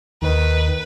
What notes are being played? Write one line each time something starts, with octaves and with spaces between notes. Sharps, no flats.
D#2 D#3 B4